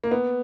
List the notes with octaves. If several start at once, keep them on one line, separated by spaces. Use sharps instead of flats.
A#3
B3